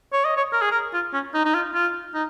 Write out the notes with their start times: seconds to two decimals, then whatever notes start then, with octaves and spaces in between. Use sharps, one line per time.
0.13 C#5
0.25 D#5
0.37 C#5
0.53 A#4
0.62 G#4
0.71 A#4
0.94 F4
1.13 C#4
1.34 D#4
1.45 D#4
1.55 F4
1.74 F4
2.14 D#4